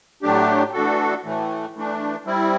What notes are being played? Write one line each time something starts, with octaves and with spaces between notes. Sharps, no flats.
A2 F#3 A3 D4 G4
E3 A3 D4 F#4 A4
A2 E3 A3
E3 A3 D4
G3 C4 E4